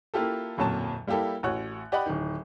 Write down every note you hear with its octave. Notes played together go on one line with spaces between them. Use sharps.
A#3 E4 F4 G4 A4
D1 F2 A#2 F#3 C#5 A5
G3 A#3 E4 G4 A4
A1 F#4 C#5 F#6
G4 D5 D#5 F#5 B5
D1 D#3